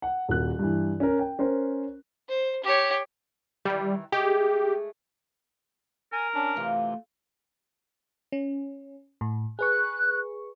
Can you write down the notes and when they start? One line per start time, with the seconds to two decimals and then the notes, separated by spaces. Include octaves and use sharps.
0.02 F#5
0.28 D#1 A#3 F#4 F#6
0.59 G2 E3
1.00 C#4 A#4
1.19 G5
1.39 C#4 A#4 C5
2.29 C5
2.64 G4 C#5
3.65 D#3 E3 G3
4.12 G#3 A3 G4 G#4
6.12 A#4 G#5
6.34 C#4 D4
6.56 C3 E3 A3 C#4 F4
8.32 C#4
9.21 A2
9.59 G#4 B4 C#6 F#6